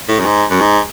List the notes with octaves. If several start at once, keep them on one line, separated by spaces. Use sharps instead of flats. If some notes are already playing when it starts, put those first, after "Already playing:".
A2
F#2
G#2
F#2
G#2